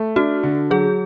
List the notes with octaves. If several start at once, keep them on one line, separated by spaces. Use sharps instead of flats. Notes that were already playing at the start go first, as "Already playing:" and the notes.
Already playing: A3
D4 F#4
D3
F#3 G#4